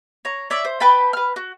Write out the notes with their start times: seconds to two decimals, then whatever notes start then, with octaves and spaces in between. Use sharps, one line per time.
0.25 C#5 A#5
0.50 C#5 D5 E5
0.65 C5
0.80 B4 G5 A5 B5
1.13 B4 F6
1.36 F#4